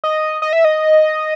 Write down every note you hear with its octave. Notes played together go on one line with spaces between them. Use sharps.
D#5
D#5
E5
D#5